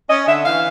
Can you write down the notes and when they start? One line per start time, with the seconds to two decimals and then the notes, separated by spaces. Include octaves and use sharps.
0.09 C#4 D#5
0.27 D3 E5
0.45 E3 F5